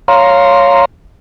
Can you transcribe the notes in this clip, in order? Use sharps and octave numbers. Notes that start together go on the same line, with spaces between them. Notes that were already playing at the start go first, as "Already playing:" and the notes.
C#5 F5 A#5 C6